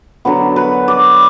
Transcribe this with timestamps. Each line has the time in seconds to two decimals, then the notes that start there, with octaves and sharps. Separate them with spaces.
0.25 D3 F#3 B3
0.56 B4
0.88 D5